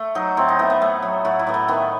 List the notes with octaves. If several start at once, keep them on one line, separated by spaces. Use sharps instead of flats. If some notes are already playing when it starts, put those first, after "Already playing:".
Already playing: A3
F#3 D#4
A2 C4
D#4
A2 B3
B3
A3
F#3
A2 F#4
E4
A2 B3
A3
D#3 B3